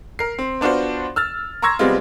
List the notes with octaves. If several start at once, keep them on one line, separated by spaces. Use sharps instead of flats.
A#4 C7
C4
B3 D4 F4 F#4 C5
E6 F6 A6
A#5 C6 C#6 E6 G#6 A#6
C3 G3 G#3 B3 C4 F4